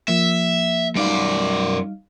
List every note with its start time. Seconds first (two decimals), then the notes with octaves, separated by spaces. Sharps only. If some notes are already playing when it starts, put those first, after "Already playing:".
0.08 F3 A#3 E5
0.95 F#2 G3 D#4 D5 F5